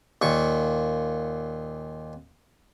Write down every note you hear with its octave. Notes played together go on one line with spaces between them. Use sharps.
D#2 A#2 C#6